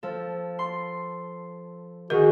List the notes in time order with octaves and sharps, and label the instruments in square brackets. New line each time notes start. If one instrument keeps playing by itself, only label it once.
[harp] F3 A4
C6
[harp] D#3 [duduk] F#4 [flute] G#4 [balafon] A#4